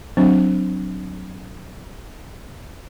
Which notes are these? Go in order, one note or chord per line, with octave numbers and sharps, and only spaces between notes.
F#3 C4 D4